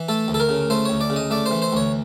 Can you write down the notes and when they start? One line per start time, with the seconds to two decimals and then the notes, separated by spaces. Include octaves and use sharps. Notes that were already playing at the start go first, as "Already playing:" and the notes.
Already playing: E3
0.09 A3 A4
0.28 D2
0.34 A4
0.40 A#4
0.49 C#3
0.70 A3 C5
0.85 D2 C#5
1.01 D5
1.10 C#3
1.16 D#5
1.31 A3 D5
1.46 C5
1.51 E3
1.62 C5
1.73 D2 C#5